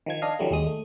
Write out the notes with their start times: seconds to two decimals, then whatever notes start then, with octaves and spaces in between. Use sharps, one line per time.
0.06 D#3 F3 G#6
0.22 D4 D#5 F5
0.39 D3 E3 F#3 G3 A3
0.51 D#2 G#3 D#6
0.66 A3